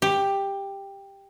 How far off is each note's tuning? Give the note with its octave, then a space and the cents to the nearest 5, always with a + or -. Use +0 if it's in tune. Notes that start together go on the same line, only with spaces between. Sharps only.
G4 +10